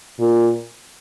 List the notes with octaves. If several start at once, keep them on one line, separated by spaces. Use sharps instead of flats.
A#2